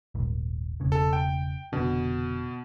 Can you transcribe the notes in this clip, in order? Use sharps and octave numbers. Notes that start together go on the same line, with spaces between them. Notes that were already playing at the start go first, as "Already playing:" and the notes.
D#1 G#1
E1 C#3
A4
G5
F1 B2 D3 D4